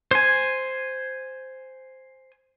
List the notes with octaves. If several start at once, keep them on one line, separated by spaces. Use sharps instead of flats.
C5 G#5